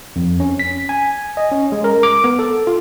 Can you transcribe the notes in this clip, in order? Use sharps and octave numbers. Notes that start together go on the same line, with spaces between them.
F2
C#4
B6
G#5
D#5
C#4
G#3
A#4
D6
B3
A4
F4